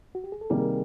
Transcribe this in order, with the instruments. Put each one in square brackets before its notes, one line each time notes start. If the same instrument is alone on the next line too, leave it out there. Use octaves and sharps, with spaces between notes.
[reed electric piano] F#4
G4
G#4
A4
[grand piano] C3 D#3 G3 A#3 [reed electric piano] G#4 A#4